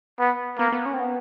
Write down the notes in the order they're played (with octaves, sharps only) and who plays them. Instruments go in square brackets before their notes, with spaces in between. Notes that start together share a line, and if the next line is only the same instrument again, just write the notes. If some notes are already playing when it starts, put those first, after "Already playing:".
[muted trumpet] B3
[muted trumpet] A#3 [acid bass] B3
[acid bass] B3
C#4
C4
B3